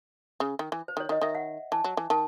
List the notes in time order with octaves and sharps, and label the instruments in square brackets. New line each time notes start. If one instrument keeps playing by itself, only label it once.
[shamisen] C#3
D#3
E3
[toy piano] C5
[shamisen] D#3
[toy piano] C#5
[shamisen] D#3 [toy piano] D#5
[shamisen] D#3 [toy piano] E5
[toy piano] F#5
[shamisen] E3 [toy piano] A5
[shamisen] F#3
E3
[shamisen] D#3 [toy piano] A5